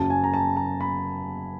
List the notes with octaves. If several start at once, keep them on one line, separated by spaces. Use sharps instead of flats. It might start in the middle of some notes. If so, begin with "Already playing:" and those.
Already playing: F#1 F#2 C#3 F#3 A5
G#5
A#5
A5
A#5
B5